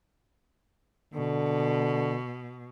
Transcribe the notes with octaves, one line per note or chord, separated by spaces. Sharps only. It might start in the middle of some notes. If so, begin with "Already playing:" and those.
B2 D3